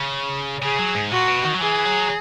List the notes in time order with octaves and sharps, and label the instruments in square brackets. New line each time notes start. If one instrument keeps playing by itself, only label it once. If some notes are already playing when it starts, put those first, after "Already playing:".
Already playing: [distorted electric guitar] C#3
[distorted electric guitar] C#3 [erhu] G#4
[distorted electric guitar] F#3
G#2
[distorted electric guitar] A#2 [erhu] F#4
[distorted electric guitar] B2
D#3
F#3
[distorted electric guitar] E3 [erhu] G#4
[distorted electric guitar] F#3